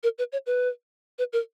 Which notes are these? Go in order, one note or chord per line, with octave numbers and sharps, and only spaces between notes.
A#4
B4
C#5
B4
B4
A#4